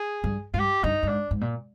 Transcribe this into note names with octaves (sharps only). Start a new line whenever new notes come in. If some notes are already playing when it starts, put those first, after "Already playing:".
Already playing: G#4
G2
G#2 F4
G2 G4
G2 D#4
G2
G#2 D4
G#2
A#2